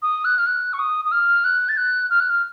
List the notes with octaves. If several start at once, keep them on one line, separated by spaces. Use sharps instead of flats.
D#6
F#6
F6
F#6
C#6
D#6
D#6
F6
F#6
A6
F#6
F6
F#6
F6